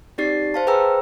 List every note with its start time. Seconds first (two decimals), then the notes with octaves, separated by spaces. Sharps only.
0.18 C4 D#4 G4 D5 A6 C7
0.54 C5 F5 A5
0.67 G#4 B4 C5 G5 A#5 E6